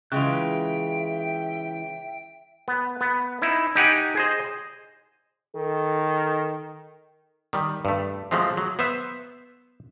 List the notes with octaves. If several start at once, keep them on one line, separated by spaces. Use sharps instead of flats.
C#3 E3 G#3 F4 E5 G5 F#6
B3
B3
D#4 E4
D#4 G4 F#5 G#5
G#4 C5 D#5
D#3 A4
D#3 G3
G2 A3
F3 F#3 G#3 A3 C4
F#3
B3 C5 E5